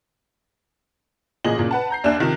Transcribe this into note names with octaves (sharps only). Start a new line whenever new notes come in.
A1 A#2 G#4 D#5 F#7
A#2 C#3
B4 F#5 A5
A#5 G6 C7
D#2 D4 E5 G#5 F#6 E7
C3 D#3 F3